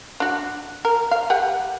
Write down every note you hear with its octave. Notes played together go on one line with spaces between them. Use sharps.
D4 F#4
A#4
F5
G4 B4 F#5